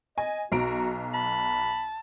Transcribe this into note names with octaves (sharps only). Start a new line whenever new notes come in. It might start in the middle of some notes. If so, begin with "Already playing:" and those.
D#5 G#5
B1 F#4 A#5 D7
A5 B5